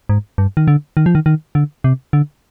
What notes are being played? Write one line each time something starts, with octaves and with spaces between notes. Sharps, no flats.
G#2
G2
D#3
D3
D#3
F3
D#3
D#3
D3
C3
D3